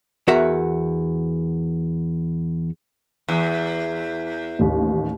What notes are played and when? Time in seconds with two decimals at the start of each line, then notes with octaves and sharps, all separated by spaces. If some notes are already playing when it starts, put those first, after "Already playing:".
0.28 E2 F#4 A#4 E5 F#5
3.29 E2
4.59 A1 D#2